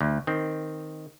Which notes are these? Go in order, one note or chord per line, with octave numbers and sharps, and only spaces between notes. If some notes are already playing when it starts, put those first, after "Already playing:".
D2
D#3 C4